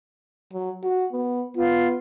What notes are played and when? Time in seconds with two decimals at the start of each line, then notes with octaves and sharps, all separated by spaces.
0.53 F#3
0.83 F#4
1.12 B3
1.56 B3 F4